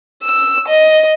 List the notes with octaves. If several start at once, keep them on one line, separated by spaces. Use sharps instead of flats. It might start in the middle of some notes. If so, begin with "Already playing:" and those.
E6
D#5